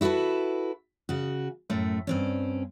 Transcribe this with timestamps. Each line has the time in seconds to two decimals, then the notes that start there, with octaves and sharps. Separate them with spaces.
0.01 E4 F#4 G#4 A4 B4
1.09 C#3 F#4
1.70 F#2 A2 A3
2.07 G2 C4 C#4